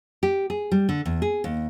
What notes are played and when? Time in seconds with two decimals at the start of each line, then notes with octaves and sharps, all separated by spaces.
0.23 G4
0.50 G#4
0.72 G3
0.89 D3
1.06 E2
1.22 G#4
1.44 D#2